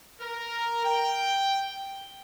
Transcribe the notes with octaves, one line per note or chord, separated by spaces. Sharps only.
A#4
G5